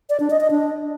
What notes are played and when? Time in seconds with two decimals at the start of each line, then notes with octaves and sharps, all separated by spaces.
0.10 D5
0.20 D4
0.30 D#5
0.40 D#5
0.51 D4